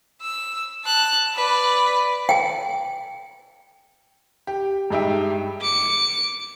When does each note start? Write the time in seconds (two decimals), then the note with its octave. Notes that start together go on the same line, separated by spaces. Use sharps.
0.22 E6
0.85 A5 F#6
1.35 B4 D5
2.29 G5 G#5
4.47 G4
4.90 G2 G#3 D#4 G4 E5 G5
5.61 D6 C#7